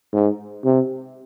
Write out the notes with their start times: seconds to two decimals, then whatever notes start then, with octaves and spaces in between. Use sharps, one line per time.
0.13 G#2
0.65 C3